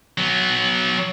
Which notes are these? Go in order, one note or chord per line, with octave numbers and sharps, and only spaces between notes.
F#3 B3